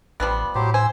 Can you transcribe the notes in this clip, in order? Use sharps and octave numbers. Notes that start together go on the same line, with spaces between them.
A1 F3 G3 B3
A2 F#3 G4 C5
C5 G#5 E6